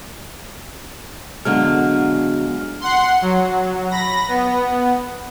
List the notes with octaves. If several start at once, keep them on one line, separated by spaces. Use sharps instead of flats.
D3 F#3 G#3 B3 F6
F#5 C6
F#3
B5 A#6
B3